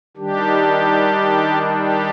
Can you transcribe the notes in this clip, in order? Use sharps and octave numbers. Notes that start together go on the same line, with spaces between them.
D#3 G3 D4 G4
G4